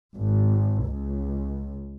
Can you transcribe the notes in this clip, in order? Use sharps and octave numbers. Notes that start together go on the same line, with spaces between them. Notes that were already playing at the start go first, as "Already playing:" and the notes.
G#1
C#2